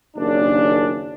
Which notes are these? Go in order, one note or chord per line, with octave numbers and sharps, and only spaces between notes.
F#1 D#2 C#3 D4